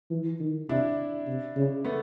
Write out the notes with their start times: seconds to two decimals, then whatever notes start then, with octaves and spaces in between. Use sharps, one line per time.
0.11 E3
0.40 D#3
0.69 C3 D4 E4
1.27 C3
1.56 C#3
1.85 A3 B3